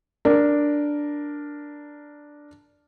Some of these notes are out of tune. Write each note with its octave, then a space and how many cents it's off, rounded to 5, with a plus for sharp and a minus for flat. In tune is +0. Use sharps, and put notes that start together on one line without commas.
D4 +0 A#4 +0